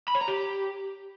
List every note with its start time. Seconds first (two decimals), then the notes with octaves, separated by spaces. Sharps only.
0.08 B5
0.15 C#5
0.21 A#5
0.28 G4